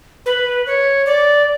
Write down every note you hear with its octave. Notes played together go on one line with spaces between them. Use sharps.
B4
C#5
D5